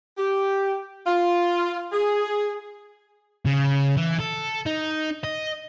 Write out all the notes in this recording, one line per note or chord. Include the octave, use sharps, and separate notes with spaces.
G4
F4
G#4
C#3
E3
A4
D#4
D#5